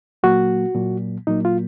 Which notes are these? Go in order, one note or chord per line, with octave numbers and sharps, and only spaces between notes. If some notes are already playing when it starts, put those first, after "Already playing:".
A#2 F#3 A#3 F#4
A#2 F#3 A#3
A#2 F#3 A#3 D#4
F4